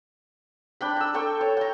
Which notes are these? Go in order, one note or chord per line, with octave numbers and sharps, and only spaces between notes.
D4 G5 B5
A#5 E6
A4 G5 C#6
C#5
G5 A#5